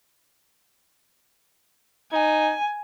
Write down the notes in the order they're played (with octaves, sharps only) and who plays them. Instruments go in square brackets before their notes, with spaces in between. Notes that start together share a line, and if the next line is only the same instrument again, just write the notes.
[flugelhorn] D#4 [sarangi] G#5